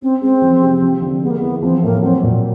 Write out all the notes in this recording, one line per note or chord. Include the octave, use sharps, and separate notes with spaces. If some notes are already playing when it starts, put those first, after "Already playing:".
C4 C#4
G#3 C4
F3
C3
F3
D3
G#3 B3
A#3
E3 B3
F3 C4
A2 A#3
F#3 C4
A#2